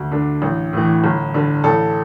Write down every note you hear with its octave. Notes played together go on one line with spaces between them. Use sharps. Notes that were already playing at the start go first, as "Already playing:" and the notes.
Already playing: D2
D3 D4
A1
A2 E3
G1
G2 D3
A1 A4